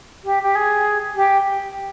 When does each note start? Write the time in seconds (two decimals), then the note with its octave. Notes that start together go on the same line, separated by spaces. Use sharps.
0.23 G4
0.42 G4
0.55 G#4
1.15 G4